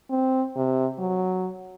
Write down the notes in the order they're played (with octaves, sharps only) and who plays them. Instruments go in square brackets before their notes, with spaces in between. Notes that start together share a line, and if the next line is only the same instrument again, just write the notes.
[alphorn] C4
C3
F#3